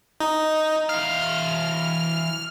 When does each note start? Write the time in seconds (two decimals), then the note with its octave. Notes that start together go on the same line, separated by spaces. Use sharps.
0.20 D#4
0.89 E3 F5 F6